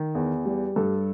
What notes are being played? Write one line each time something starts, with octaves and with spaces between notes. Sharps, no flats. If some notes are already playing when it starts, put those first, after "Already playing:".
Already playing: D#3
E2
G3
G2 A4